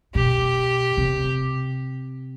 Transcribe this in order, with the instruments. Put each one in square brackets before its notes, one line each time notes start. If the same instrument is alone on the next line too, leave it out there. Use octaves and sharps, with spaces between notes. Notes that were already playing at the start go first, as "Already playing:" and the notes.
[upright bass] B2 [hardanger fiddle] G4
[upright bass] C3